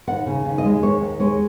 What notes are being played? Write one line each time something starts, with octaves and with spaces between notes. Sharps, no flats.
D#2 F#5
C#3
D#2
D#5
G#3
D#2 C#5
D#2
G#3 C#5